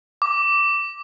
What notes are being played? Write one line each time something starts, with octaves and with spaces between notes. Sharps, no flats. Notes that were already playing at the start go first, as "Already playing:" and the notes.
D6